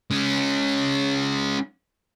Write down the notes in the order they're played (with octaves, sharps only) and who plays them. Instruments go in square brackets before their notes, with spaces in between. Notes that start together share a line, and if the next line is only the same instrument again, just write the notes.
[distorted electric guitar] G#3 C#4